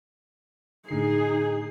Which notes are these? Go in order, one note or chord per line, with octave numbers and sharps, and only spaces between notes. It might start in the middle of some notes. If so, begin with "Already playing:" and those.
A2 D3 D#4 G#4 C7